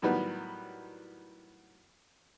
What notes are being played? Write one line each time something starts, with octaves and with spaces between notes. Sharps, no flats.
A2 D#3 F#3 G3 B3